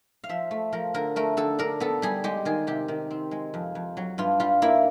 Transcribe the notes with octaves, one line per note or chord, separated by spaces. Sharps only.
F5
F3 E5
A3
F3 A#4
D3 A#4
A3 A#4
D3 A4
D4 A#4
B3 A4
G3 G#4
G#3 G4
D#3 G#4
C3 G4
D#3
C4
G#3
F2
F2
F#3
G2 F4
G3 F4
A#3 E4